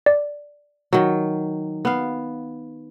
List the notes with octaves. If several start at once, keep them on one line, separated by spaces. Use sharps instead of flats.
D5
D#3 F#3
B3 F5